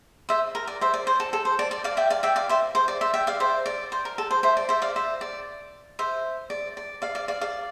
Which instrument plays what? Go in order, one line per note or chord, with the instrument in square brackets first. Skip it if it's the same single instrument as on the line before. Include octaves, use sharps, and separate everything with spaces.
[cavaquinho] C5 E5
A#4
D5
C5 E5
D5
C5
A4
A4
C5
D5
D5
D5 F5
E5 G5
D5 F5
E5 G5
D5 F5
C5 E5
C5
D5
C5 E5
E5 G5
D5 F5
C5 E5
D5
C5
A#4
A4
C5
C5 E5
D5
C5 E5
D5 F5
C5 E5
D5
C5 E5
D5
D5
D5 F5
D5 F5
D5 F5
D5 F5